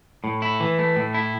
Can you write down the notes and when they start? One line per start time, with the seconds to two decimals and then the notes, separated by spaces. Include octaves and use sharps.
0.24 A2
0.42 E4
0.60 E3
0.79 A3
0.96 A2
1.14 E4